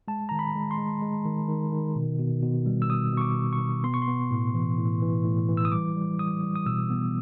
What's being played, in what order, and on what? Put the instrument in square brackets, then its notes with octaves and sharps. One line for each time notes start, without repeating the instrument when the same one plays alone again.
[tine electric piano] G#3 A5
D#3 A#5
B5
G#3
C6
G#3
G#3
D#3
D#3
D#3
B2
B2
B2
G3
E6
B2 D#6
B2 C#6
D6
B2
C#6
B2
B3 C6
C#6
C6
B3
A2
E3
A2
E3
A2
E3
E6
D#6
G3 D6
G3
G3 D#6
G3
D#6
B2 E6
B3